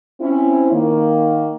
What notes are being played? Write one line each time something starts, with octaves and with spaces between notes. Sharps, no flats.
C4 C#4 E4
D#3 A#3